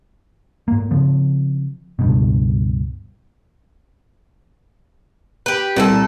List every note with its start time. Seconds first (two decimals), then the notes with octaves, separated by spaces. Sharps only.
0.68 G#2 A#3
0.91 C#3 F3 C4
1.99 C#2 G2 B2
5.46 G4 B4
5.76 C2 A#2 F#4 A4